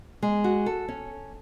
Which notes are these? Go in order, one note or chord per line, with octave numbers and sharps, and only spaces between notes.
G#3
F#4
A4
C#4